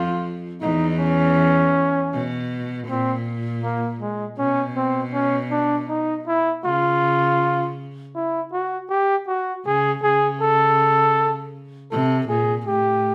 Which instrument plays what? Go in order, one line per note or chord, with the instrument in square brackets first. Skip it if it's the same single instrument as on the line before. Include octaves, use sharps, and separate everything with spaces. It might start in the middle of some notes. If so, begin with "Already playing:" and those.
Already playing: [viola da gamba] F2 F3 [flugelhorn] F4
[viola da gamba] E2 E3 [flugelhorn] D#4
[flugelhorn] C#4
[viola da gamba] B2
[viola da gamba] A#2 [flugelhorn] C4
[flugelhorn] A#3
G#3
[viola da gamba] B2 [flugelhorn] C#4
[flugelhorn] C4
C#4
D4
D#4
E4
[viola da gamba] C#3 [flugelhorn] F4
[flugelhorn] E4
F#4
G4
F#4
[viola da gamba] C#3 [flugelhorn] G#4
[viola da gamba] C#3 [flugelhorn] G#4
[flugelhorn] A4
[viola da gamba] C3 [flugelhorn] A4
[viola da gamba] A#2 [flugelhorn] G#4
[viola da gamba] A2 [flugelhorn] G4